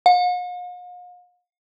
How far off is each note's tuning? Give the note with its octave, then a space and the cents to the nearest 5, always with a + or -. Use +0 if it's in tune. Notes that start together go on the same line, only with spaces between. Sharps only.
F5 +45